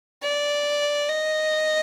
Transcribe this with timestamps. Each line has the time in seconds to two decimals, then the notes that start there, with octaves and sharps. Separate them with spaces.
0.23 D5
1.08 D#5